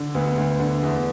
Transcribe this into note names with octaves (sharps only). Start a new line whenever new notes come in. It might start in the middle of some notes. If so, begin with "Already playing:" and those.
Already playing: D3
D2 B3
D2
D3
E2